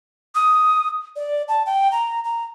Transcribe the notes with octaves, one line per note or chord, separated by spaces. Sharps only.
D#6
D5
A5
G5
A#5
A#5